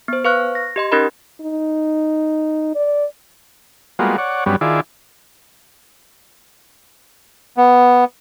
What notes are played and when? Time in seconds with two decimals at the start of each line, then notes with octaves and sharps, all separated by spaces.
0.08 B3 C5
0.24 B4 F5 C#6 F6 F#6
0.55 A#6
0.76 G4 D#5 C6
0.92 C#4 D#4 G4 A#4 D#5 B5
1.41 D#4
2.75 D5
3.99 G3 G#3 A#3 B3 F4 F#4
4.18 C#5 D5 F#5
4.46 G2 F#3 G3 B3 C#4
4.61 D#3 E4 F4 G#4 D5
7.57 B3